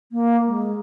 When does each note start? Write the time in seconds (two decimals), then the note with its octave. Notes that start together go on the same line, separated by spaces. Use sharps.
0.12 A#3
0.47 G#3